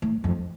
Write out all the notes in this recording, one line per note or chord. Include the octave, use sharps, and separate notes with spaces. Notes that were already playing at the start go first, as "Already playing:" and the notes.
A2
F2